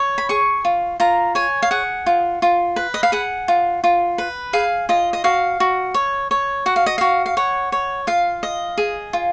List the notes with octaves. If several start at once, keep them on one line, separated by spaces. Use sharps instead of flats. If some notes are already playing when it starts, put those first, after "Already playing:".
Already playing: C#5
B5
G#4 C#6
F4
F4 A#5
C#5 G#5
F5
G#4 F#5
F4
F4
B4
D#5
F5
G#4 F#5
F4
F4
B4
G#4 F5
F4 D#5
D#5
F#4 F5
F#4
C#5
C#5
F#4 F#5
F5
D#5
F#4 F5
F5
C#5 F#5
C#5
F4 F5
D#5
G#4
F4